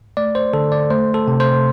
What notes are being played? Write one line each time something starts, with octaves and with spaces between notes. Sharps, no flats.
A3 D5
C5
D3 A4
D5
A3 C5
A4
C3
C5